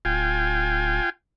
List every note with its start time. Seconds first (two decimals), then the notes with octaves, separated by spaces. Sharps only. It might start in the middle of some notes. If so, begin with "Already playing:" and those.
0.05 D1 F4 G5 G#5